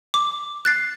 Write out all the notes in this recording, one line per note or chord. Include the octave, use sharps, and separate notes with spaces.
D6
F#6 A6 C7